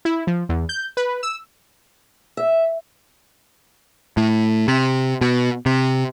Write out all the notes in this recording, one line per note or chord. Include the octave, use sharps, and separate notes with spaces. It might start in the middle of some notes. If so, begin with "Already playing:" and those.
E4
F3
E2
G6
B4
E6
E5
A2
C3
B2
C3